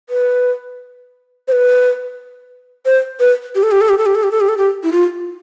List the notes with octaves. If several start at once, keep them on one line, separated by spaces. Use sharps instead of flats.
B4
C5
B4
C5
B4
G4
A4
G4
A4
G4
A4
G4
A4
G4
A4
G4
A4
G4
E4
F4